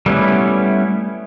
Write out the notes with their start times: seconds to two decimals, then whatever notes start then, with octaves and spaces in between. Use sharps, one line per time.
0.06 G3 A3 B3 C#4 E4